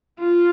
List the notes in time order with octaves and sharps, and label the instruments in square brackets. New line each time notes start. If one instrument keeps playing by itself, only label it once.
[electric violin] F4